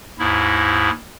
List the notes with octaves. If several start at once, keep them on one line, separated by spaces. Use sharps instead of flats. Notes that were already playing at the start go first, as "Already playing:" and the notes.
D#2 G#2 E4